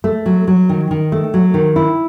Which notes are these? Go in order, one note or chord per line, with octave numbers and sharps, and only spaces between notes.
A3
F#3
F#3
D#3
D#3
A3
F#3
D#3
E4